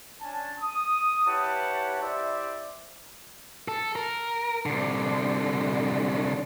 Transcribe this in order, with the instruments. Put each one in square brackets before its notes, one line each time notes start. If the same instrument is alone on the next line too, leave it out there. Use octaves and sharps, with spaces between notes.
[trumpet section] C#4 D4 G#5 A5
D#6
E4 G4 B4 C#5 F#5 A5
E4 G4 C5 D5 E5
[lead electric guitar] A4
A#4
C2 D3